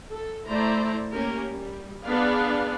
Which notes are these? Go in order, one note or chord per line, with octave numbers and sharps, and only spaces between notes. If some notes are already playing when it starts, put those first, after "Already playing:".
A4
A3 E4 C5 D5 A#5
A#3 C#4 G4 A#4
G3
B3 D4 G#4 B4 D5 F5